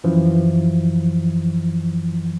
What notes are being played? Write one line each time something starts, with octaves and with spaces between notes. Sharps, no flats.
F#2 E3 F3